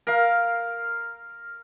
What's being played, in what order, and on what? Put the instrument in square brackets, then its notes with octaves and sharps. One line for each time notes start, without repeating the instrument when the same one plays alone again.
[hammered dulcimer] A#4 F5